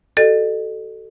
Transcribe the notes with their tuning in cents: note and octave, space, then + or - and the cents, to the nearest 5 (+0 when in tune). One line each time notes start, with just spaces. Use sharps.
F#4 +45 A4 +5 D#5 -40